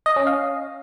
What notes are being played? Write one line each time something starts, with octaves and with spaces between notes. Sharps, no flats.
D#5
C#4
F5